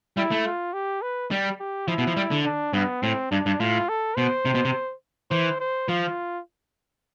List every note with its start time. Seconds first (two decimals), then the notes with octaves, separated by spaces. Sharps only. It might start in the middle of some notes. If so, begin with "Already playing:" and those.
0.17 G3 E4
0.31 A3
0.46 F4
0.73 G4
1.02 B4
1.31 G3
1.60 G4
1.88 F3 E4
1.98 B2
2.07 F3
2.17 G3
2.31 D3
2.45 D4
2.73 G2 B3
3.02 A2 C4
3.31 G2 D4
3.46 G2
3.60 A2 F4
3.89 A4
4.17 B2 C5
4.45 C3
4.55 B2
4.65 C3
5.31 E3 C5
5.60 C5
5.88 F3 F4